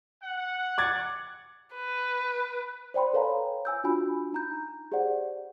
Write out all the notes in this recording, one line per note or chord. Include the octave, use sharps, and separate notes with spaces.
F#5
D6 G#6 A6
B4
C5 D5 G5 B5 C6
A4 B4 C#5 F5 G#5 A#5
G#5 E6 G6
D4 F4 F#4 G#5 B5
D#4 A#5 G6
G4 G#4 C5 D5 F#5